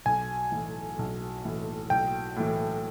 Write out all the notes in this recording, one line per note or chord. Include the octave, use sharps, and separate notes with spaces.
B1 G#5
A2 E3
B1
A2 E3
B1 G5
A2 E3